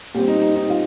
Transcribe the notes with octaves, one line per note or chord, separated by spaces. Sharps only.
A#2 G3 C4 G4
D#4
D#4
D#4
F4